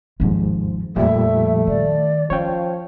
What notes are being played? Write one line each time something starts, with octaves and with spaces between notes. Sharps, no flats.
G#1 D#2 G#2 F3
F2 A#2 F3 G3 A3 E5
D#3 D5
F3 C#4 C#5 F5 G5